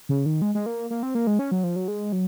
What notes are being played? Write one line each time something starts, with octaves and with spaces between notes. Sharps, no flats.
C#3
D#3
G#3
G#3
A#3
A#3
C4
A#3
G#3
C#4
F#3
F3
F#3
G#3
F#3